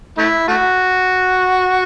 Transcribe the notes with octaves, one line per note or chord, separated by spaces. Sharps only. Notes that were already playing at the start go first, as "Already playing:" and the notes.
A3 E4
A3 F#4